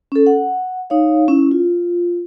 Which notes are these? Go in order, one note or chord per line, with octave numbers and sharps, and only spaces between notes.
C#4 A4
F#5
D#4 C#5 F5
C#4 E4
F4